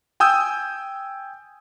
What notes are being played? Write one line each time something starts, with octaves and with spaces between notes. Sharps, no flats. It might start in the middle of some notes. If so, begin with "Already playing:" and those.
G5 G#5 D#6 E6 G6